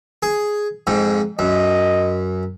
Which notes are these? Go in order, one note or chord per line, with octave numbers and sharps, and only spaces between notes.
G#4
F2 G#2
F#2 D#5